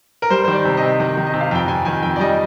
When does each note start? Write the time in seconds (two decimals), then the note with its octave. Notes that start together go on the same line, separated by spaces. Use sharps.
0.22 A#4
0.30 G3 C5
0.44 D#3 C5
0.53 D5
0.65 C3
0.77 D#5
0.83 C3
1.00 D#3
1.17 D#3
1.26 D#5
1.33 C3
1.41 F5
1.51 F2 G5
1.68 F2 G#5
1.85 D#3 G#5
2.02 F2 G5
2.16 D5
2.20 G3 D#5